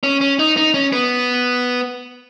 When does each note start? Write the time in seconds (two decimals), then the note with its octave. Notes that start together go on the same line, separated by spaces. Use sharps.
0.03 C#4
0.21 C#4
0.39 D#4
0.57 D#4
0.74 C#4
0.93 B3